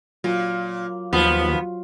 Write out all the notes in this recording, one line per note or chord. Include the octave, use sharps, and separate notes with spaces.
A#2 F#3 F4
D#2 F3 F#3 B3 F4 F#4